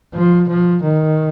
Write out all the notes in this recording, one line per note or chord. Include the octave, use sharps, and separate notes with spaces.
F3
F3
D#3